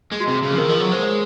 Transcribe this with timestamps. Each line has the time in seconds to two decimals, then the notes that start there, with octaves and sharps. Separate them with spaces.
0.12 G#3 G#4
0.20 F#4
0.27 C3 G#4
0.42 C#3
0.51 F3 G#4
0.58 D#3 A#4
0.69 F3 A#4
0.80 F#3 G#4
0.91 G#3 C5
1.03 C#5